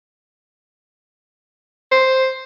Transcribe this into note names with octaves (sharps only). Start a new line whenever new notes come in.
C5